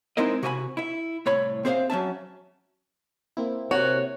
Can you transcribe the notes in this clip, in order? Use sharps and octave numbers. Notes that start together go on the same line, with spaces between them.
G#3 C4 D#4 E4 A#4 D#5
C3 F#4 D#5 E5 G#5 B5
E4 E5
C2 A2 C#5 B5
C4 G#4 C5 E5 F5
F#3 C#4 E5 A5
A#3 C4 E4
C3 F#4 C#5